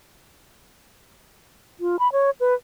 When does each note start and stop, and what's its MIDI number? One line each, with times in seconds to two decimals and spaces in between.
1.80 1.96 65
1.99 2.11 83
2.12 2.30 73
2.40 2.54 71